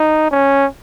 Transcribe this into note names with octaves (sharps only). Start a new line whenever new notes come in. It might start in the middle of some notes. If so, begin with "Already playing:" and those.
Already playing: D#4
C#4